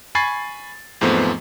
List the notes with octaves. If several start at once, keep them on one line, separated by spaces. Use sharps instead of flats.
G#5 B5 C#6 G#6 A6 C7
E2 G#2 F3 A3 B3 C4